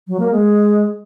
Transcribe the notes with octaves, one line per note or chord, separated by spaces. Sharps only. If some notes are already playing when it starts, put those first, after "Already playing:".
F#3
A#3
G#3